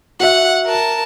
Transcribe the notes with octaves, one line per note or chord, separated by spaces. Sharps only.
F#4 E5 F#5
A#4 A5